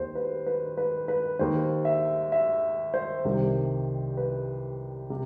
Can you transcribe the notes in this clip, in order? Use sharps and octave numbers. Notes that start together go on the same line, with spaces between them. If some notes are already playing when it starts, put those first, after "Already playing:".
Already playing: D#2 D#3 C5
B4
B4
B4
B4
D#2 D#3 C5
E5
E5
C5
C2 C3 D#3
B4
C3